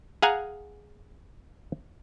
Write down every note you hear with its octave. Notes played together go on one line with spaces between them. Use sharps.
G#4 F5 F#5 G#5 A#5